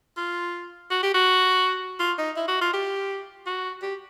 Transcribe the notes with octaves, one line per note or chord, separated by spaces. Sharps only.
F4
F#4
G4
F#4
F4
D#4
E4
F#4
F4
G4
F#4
G4